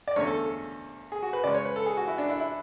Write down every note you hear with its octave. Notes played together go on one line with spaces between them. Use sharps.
D5
E2 D3 A3 C#4 C#5
A4
A4
G#4
F#4
B4
C#3 G#3 C#4 D5
C#5
B4
A4
G#4
F#4
E4
D4
E4
E4